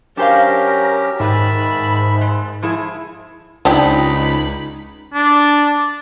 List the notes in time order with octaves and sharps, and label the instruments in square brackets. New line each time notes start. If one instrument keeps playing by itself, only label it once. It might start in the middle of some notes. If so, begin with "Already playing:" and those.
[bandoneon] F#3 C#4 G4 [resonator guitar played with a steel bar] D4 C5 F5 [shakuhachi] A#4
[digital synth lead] G#2 [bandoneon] D#3 E5 A5 [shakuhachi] B5
[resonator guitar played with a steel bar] G#3
F3 E4 G#4
[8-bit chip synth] C#2 B5 [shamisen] F3 D4 G4 [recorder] D#4
[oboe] D4